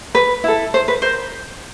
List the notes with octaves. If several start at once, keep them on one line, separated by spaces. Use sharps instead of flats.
B4
E4 A4
C5
B4
A#4 C5